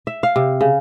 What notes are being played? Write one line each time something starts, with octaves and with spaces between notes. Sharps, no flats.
E5
F5
C3
C#3